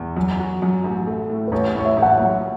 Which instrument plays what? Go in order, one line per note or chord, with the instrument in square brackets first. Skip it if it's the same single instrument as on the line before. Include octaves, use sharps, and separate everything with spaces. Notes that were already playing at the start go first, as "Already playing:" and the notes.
Already playing: [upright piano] E2
F#2
F#4
F#2
A1
A3
A2
[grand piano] B4
[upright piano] A1 [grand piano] C#5
[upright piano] A2 [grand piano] C#5
[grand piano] E5
[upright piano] A1
[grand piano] F#5
[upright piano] B1